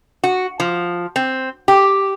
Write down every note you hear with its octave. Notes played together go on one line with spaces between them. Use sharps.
F#4
F3
C4
G4